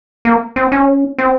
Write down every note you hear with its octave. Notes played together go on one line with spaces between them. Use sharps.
A#3
C4
C#4
C4